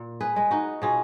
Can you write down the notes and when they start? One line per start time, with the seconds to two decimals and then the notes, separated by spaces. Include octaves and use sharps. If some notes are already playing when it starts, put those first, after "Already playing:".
Already playing: A#2
0.20 G#4 B4
0.36 G#3
0.51 D#4 F#4
0.82 B2 F4 G#4